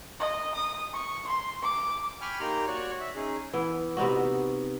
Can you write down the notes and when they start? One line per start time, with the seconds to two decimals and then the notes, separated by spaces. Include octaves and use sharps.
0.19 D#5
0.54 D#6
0.93 C#6
1.27 C6
1.62 D6
2.21 G5 G#5 B5 C#6 F6
2.40 A#3 D#4 G4 A#5 C6
2.67 F#4 C#5 D5 C#6
3.00 E5
3.15 C#4 D#4 G#4
3.53 E3 B3
3.97 C3 B3 D#4 F#4